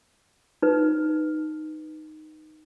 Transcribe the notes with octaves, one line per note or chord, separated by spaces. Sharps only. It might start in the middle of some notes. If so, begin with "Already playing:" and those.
D#4 B4